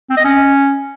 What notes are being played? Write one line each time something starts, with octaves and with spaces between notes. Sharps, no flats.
C4
D#5
C#4